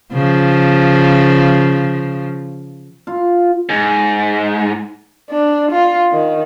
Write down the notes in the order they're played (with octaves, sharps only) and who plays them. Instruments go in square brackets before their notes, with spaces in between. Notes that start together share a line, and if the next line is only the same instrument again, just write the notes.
[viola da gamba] C#3 F3
[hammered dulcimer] F4
[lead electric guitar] G#2
[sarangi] D4
F4
D#3